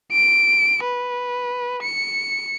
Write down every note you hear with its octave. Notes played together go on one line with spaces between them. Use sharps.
D7
B4
C#7